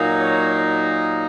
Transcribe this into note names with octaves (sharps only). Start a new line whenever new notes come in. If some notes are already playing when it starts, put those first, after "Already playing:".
Already playing: A#2 F#3 A#3 D#4
C#5